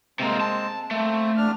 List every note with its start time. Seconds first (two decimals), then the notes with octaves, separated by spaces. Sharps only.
0.20 C3 G#3 A#3 C4
0.41 A5
0.91 A3 A#3 C4
1.37 E2 D4 F6